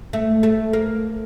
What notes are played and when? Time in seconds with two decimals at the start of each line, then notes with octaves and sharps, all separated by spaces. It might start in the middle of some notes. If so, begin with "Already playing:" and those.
0.13 A3
0.43 A3
0.73 A#3